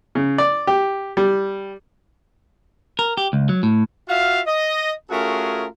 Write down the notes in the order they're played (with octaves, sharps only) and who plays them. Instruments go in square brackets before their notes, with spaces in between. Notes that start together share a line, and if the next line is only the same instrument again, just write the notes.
[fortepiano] C#3
D5
G4
G3
[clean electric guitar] A#4
G4
C#2
F#3
A2
[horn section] F4 F#4 E5 F5
D#5
A3 C#4 F4 F#4 G#4 A#4